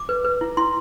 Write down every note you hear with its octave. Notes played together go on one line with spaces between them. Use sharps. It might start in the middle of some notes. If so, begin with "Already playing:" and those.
Already playing: D6
B4
B4
E4
E4 C6